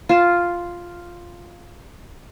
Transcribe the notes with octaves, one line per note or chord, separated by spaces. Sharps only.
F4 A5